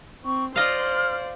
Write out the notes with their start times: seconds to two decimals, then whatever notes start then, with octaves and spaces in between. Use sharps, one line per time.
0.25 C4 C#6
0.56 F4 C5 D5 D#5 F5 F6